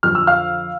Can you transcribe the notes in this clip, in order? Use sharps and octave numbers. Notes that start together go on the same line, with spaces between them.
F2 D3 F3 F6
E6
F5 F6